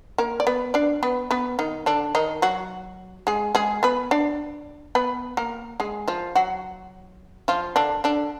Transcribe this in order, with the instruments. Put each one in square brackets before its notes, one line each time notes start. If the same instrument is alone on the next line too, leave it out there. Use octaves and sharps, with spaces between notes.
[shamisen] A#3 A#4
D5
B3 B4
D4 D5
B3 B4
B3 B4
D#3 D#4
D3 D4
D#3 D#4
F#3 F#4
G#3 G#4
G#3 G#4
B3 B4
D4 D5
B3 B4
A#3 A#4
G#3 G#4
F3 F4
F#3 F#4
F3 F4
D3 D4
D3 D4